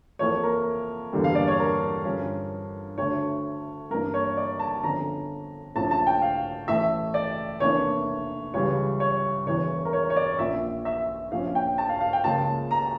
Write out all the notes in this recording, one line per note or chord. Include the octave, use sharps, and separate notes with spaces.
F2 E3 A#3 C#5
A#4
E1 E2 D3 G3 A#3
F5
D5
C#5
A#4
G2 D3 F3 C#4
D2 D3 A3 C#5
G2 E3 A#3 D4 A#4
C#5
D5
A5
G1 F2 D3 F3 C#4 A#5
A#1 A2 F3 C#4 A5
A5
G5
F5
A1 A2 E3 A3 E5
D5
F1 E2 E3 A#3 D4 C#5
C#2 C#3 E3 G3 C#5
C#5
E1 E2 E3 C#5
A#4
C#5
C#5
D5
A#1 A#2 F3 C#4 E5
E5
A#1 A#2 F3 C#4 F5
G5
A5
F5
F5
G5
C#2 C#3 F3 A#3 A5
A#5